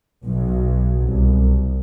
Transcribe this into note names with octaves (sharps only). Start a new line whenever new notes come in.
B1
C2